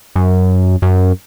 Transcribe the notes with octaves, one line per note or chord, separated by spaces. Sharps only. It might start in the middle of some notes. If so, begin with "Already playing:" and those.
F#2
F#2